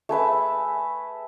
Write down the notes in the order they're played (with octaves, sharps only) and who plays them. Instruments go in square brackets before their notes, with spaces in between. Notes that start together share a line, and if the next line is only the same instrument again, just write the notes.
[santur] A3 G#4 B4 E5